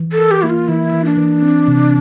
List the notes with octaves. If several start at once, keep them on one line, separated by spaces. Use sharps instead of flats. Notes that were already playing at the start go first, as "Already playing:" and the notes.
Already playing: E3
A4
A#4
G4
A#3 E4
F4
E3 E4
E3
D4
E3
C4
C3